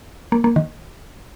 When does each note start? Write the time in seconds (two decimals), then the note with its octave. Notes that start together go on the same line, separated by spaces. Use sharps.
0.32 A#3
0.44 A#3
0.56 D#3